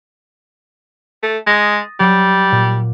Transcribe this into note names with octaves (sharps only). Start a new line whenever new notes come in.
A3
G#3 D#6 A6 A#6
F#3 G3
A#2